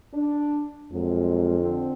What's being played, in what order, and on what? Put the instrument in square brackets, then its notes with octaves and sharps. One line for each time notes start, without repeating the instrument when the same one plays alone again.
[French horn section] D4
[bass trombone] F2 [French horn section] A#2 F#3 G#3
[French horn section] D3 C4